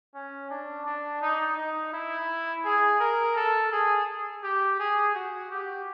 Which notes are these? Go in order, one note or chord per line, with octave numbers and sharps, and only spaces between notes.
C#4
D4
D4
D#4
D#4
E4
G#4
A#4
A4
G#4
G4
G#4
F#4
G4